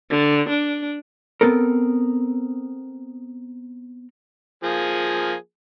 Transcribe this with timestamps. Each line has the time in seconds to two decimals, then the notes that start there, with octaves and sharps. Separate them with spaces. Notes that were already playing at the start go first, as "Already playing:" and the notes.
0.10 D3
0.49 D4
1.41 B3 C4 A4 A#4
4.64 F3 A#3 G#4